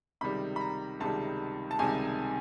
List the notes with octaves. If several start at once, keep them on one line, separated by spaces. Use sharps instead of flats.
C#2 C3 D#3 G3 B5
B5
A#5
C#2 C3 D#3 G3 A5
A5
C#2 C3 D#3 G3 G#5